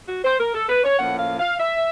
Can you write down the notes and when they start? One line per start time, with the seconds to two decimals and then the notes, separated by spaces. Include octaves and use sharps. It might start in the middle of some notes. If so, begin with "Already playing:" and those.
0.08 F#4
0.24 C5
0.39 A#4
0.54 A4
0.69 B4
0.84 C#5
0.99 A2 F3 A#3 C#4 F#5
1.19 F5
1.40 F5
1.60 E5